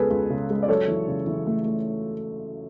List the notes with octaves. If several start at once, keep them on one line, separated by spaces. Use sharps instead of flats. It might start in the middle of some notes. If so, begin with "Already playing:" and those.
Already playing: C#2 C#3 G#3 B3 G#4 A4 B4
C#2
C#3
G#3
D5
F#2 A4 C#5
E3
C#3
E3
A3
A3